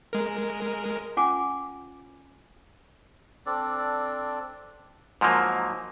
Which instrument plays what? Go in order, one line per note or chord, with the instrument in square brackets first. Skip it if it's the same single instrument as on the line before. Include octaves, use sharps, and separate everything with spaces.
[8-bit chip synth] G#3 A#4
[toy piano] C#4 F4 F#5 G#5 D6
[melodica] C4 D4 A4 D5
[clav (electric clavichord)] G#2 F3 F#3 A#3